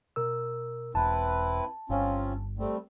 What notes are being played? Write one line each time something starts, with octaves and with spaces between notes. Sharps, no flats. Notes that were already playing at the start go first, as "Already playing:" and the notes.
B2 A#4 E6
E1 C4 E4 B4 A5
G1 C4 C#4 F4
G3 A3 C4